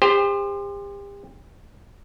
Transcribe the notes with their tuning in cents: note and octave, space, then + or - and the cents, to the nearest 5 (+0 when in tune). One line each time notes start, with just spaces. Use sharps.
G4 +40 C5 +0